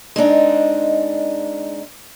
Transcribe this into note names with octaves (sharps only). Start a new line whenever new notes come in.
G#3 C4 D4 D#4